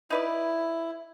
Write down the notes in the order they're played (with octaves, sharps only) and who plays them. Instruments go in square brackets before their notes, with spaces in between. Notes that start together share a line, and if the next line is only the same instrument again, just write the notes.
[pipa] D#4 B4 D5 [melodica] E4